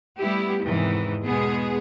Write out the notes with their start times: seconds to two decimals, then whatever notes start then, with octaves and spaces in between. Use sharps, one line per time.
0.19 G3 A3 B3 E4 G4
0.65 E2 G#2 C3 D#3 E3
1.23 E2 B2 G#3 B3 G#4